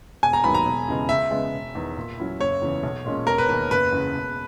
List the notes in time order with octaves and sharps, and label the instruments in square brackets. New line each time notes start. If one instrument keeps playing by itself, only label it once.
[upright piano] E1 [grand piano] G#5
[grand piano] A#5
[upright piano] D#2 D#3 F#3 B3 [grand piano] B5
[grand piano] A#5
[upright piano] E1
E2 C#3 E3 G#3
[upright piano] C#2 [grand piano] E5
[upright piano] C#3 G#3 B3
E1
E2 D#3
A#2
F#3 C#4 E4
[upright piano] F#1 [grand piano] C#5
[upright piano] E2 C#3 E3
B1
A#2 G#3 C#4
[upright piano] E1 [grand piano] A#4
[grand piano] B4
[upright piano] D#2 D#3 [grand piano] B4
[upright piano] F#1 [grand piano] B4
[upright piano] E2 C#3
E1